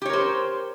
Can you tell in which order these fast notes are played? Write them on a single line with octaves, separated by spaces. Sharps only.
G4 C#5 A#4 C5